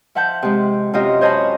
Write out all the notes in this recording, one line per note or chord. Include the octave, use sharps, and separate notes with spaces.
F3 E5 F#5 A5 G6
C3 G#3
F#2 C3 F4 D#5 E5
C5 C#5 D#5 G#5 A5 B5